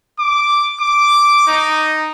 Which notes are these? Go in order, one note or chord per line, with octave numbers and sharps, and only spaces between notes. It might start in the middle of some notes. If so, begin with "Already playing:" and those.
D6
D6
D#4